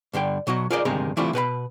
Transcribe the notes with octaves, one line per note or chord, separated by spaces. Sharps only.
G2 D3 G3 G5
B2 F#3 F#4 D#5
F4 G#4 A#4 C5 D5 D#5
D2 G2 C3 D#3 G#3 A#5
E3 G3 A3 C4 E4 F4
B2 B4 F#5 B5